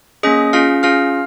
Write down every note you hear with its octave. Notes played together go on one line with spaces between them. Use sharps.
A#3 C#4 G#4 D#5 D#6
C#4 F4 G#4 F5 F6
C#4 F4 G#4 F5 F6